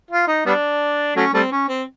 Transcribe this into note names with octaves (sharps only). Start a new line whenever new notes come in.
F4
D#4
G3 B3 D4
F#3 A3 C#4
G3 A3 C4
C#4
C4